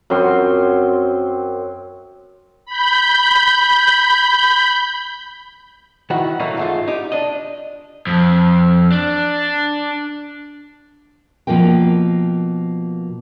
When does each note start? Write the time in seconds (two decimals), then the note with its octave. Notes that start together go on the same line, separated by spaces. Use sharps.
0.10 F#2 C4 C6
2.66 B5 G6
6.10 D#3 E4 F#4 F#5
6.40 E3 F#3 A3 A#3 D#4
6.57 G#2 A3 F4
6.88 D#4 G4
7.12 D4 D#5
8.07 F2
8.92 D4
11.47 B2 F3 A#3 A#4 G5